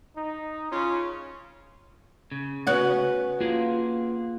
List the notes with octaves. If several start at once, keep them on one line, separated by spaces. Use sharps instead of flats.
D#4
C#3 C#4 F4
C#3
B3 C#4 F#4 F#5 F#6
A#3 F4 G#4